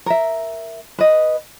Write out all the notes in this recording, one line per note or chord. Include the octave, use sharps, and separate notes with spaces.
A#4 E5
B4 D#5